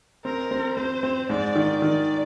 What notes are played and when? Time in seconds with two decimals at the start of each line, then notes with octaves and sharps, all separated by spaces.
0.24 C4 A#4
0.51 C4
0.77 C4 C5
1.03 C4
1.30 G#2 D5
1.55 D#3
1.82 D#3 D5